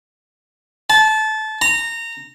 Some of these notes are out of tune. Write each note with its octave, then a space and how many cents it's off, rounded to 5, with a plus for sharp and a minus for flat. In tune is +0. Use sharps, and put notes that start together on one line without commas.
A5 -20
A#5 -20